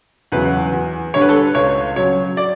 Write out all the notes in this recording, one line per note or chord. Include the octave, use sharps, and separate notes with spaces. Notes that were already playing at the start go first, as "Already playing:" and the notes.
E2 C#3 F#3 B4
E2
D3 G3 C#5
B4
A4
B4
C#2 C#5
C#3 F#3 C#5
D5